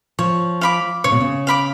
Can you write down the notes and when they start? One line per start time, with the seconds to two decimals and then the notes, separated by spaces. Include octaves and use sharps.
0.19 F3 C#5
0.61 F5 B5 D6
1.04 C#3 C#5
1.12 B2
1.20 C#3
1.47 F5 B5 D6